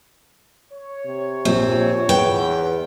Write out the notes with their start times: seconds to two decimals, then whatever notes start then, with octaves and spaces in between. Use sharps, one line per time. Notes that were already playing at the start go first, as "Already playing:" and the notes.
0.70 C#5
1.06 C3
1.45 A#1 C4
2.09 E2 B4 G5